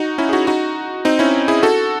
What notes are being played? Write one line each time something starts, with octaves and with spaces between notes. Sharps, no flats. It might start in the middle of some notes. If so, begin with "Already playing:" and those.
Already playing: D#4 F#4
C#4 E4
G#4
D#4 F#4
D#4 F#4
C4 D#4
C#4 E4
E4 G#4
F#4 A4